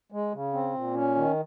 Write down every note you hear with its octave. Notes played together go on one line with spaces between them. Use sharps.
G#3
C#3
C4
A#2
C#4
D#3